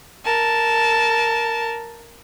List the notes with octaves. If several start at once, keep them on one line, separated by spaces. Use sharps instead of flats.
A#4 A5